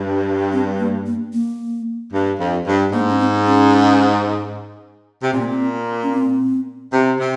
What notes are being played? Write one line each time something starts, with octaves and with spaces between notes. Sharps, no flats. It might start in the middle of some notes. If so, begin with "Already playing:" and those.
Already playing: G2
C4
A#3
A#3
A#3
G2
F2
G2
G#2 A#3
C#4
C4
C#4
C3
A#2 C4
A#3
C4
C#4
C4
C3
C3